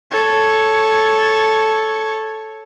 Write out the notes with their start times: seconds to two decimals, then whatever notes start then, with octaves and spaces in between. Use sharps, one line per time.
0.11 A4 C#5